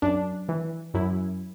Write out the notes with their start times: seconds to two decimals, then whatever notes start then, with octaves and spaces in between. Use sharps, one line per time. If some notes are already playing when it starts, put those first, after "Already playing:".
0.02 F#2 D4
0.49 E3
0.94 F#2 E4